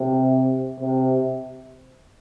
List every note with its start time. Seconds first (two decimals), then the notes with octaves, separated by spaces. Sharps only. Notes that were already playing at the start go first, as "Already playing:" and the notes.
Already playing: C3
0.80 C3